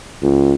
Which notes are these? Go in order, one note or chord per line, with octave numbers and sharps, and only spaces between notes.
C#2